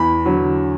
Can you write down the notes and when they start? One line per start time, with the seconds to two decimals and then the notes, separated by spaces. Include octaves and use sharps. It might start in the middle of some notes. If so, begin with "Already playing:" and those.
Already playing: E2 B5
0.26 D3 F#3